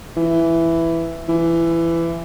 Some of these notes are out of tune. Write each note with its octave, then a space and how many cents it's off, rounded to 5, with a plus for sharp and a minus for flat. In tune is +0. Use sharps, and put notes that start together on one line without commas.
E3 +5
E3 +20